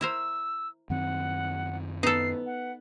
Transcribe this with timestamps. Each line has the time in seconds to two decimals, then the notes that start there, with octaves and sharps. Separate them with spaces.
0.01 E4 A#4 C5 E6
0.90 F#2 D#3 C4 F#5
2.03 B3 D#4 A4 C7
2.46 F#5